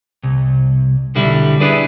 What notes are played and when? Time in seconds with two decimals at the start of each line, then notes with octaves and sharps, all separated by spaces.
0.23 C2
1.15 B1 D3 G3 E4
1.60 D4 E4 G#4 B4 D5